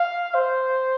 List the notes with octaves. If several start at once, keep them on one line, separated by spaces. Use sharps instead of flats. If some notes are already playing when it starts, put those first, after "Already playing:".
Already playing: F5
C5